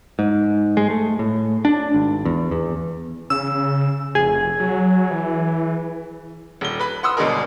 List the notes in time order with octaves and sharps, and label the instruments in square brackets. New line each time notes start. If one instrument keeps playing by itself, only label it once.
[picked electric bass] G#2
G#3
A3
A2
D4
G#1
E2
E2
[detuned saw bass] C#3 [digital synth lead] E6
[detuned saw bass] F1 [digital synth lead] G#4
[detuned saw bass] F#3
E3
[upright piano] D#1 G7
B4 B5
F#5 C6 D#6 E6
G1 B2 G#3 D4 G#4 A#4